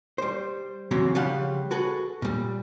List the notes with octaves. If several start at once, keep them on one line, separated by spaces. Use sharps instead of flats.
G3 C5
C#3 E3 F#3 C4 C#4
C#3 F3 G3 G4 F5 F#5
F#4 G#4 A4 B4
A#2 G3